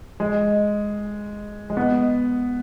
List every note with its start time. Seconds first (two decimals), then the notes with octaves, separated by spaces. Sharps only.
0.20 G#3
1.70 G#3
1.77 B3